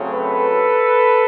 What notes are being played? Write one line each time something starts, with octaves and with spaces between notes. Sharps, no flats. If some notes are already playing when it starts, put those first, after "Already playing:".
Already playing: C#3 F#3 A3 C4
A4 B4